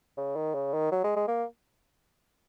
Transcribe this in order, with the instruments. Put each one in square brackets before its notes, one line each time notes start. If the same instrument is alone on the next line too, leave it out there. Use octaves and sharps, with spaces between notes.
[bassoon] C#3
D#3
C#3
D#3
F#3
G#3
G#3
A#3